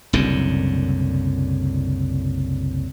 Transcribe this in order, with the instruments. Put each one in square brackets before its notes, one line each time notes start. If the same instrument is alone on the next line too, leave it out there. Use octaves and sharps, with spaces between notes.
[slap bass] F#1 C2 F#2 D3